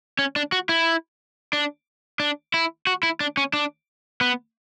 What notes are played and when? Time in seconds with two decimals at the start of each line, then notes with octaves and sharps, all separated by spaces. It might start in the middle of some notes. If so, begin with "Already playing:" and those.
0.19 C#4
0.36 D4
0.52 F#4
0.69 E4
1.53 D4
2.20 D4
2.54 E4
2.87 F#4
3.03 E4
3.20 D4
3.37 C#4
3.53 D4
4.21 B3